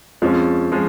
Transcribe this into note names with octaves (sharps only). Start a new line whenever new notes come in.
F2 F3 G#3 C#4
F3 G#3 C#4